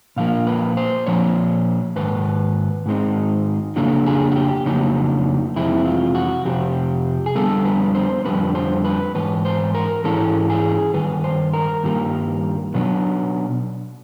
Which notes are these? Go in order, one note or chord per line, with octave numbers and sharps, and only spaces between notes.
A#2 F3 A#3 F5
B4
C5
A#2 F3 A#3 C#5
G#2 D#3 B4
G#2 D#3 G#3 C4 D#4
F2 C#3 F#3 A#3 D4 A4
G#4
F#4
G4
F2 C#3 F#3 A#3 D4 D#4
F2 C3 E3 G#3 C4 E4
F4
F#4
F2 C3 C4 G4
G#4
F2 D3 G3 B3 A4
B4
C5
F2 D3 G3 B3 B4
C5
B4
G#2 E3 B4
C5
A#4
G#2 E3 G#3 C#4 A4
G#4
G2 D#3 B4
C5
A#4
G2 D#3 G3 A#3
B2 F#3 B3 D4